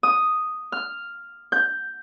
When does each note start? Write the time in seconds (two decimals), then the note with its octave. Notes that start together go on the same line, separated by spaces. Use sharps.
0.03 D#6
0.72 F6
1.52 G6